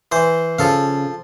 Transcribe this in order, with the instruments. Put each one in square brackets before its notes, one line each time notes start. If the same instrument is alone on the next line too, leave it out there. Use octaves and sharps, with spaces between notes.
[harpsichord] E3 C5
[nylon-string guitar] C#3 [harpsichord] F3 A4 F5